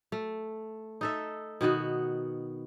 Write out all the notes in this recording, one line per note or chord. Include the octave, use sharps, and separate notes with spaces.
A3
D#4 A4 E5
B2 D#3 B3 F#4